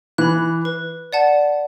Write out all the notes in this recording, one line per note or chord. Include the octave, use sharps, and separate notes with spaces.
E3 B5 F#6
B4
D5 F#5 A5